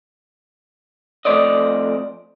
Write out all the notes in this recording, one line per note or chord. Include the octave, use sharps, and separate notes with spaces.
F2 G#3 A3 C5 D5 D#5